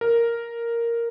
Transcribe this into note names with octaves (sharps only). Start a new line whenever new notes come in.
A#4